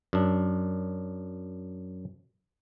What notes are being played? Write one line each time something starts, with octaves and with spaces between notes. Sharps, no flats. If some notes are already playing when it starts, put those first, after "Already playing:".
F#2 D4